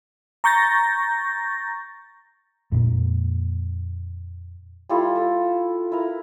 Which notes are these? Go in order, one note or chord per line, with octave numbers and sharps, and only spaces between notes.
A#5 C#6 G6 A6 A#6
F2 A#2 A#3
G3 E4 F4 A4
A4
E4 A#4